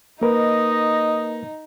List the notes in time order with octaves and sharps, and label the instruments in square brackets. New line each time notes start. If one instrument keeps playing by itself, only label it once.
[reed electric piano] A#3 A#4 B4 [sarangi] D#4 [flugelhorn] D#5